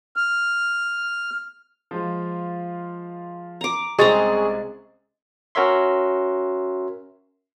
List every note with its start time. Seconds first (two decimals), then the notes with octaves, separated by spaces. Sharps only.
0.16 F6
1.91 F3 G#3 F4
3.61 A#5 D6
3.99 C2 C#3 G#3 C4 G#4 A#5 C#6 A6
5.55 C#4 F#4 A#4 C#5 E5 C6